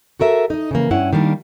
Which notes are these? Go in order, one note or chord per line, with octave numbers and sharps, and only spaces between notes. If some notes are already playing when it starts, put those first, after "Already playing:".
F#4 A4 A#4 E5
D#4 D#5
C#3 E3 A#3
G2 C#4 E4 F#5
D#3 G3 A#3 D4